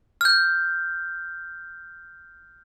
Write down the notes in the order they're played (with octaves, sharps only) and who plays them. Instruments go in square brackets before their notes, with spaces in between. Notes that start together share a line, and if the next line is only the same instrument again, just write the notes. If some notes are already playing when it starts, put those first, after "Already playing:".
[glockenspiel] F6 G6